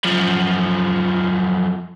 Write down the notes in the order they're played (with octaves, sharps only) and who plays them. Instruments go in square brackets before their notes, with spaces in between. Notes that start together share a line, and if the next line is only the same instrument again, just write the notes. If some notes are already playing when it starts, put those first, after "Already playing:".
[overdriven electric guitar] F#2 F3